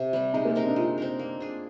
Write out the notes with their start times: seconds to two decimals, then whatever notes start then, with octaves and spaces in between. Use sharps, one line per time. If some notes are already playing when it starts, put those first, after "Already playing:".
Already playing: C3
0.13 G3 C4
0.34 G#3 D#4
0.45 A#3
0.55 C4 D#4 A#4
0.67 D4
0.76 G#3 F4
0.98 C4 D#4 A#4
1.19 A#3
1.40 D4 G#4